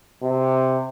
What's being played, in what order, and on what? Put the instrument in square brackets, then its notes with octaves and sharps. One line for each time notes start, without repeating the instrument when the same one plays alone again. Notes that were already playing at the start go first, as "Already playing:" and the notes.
[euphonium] C3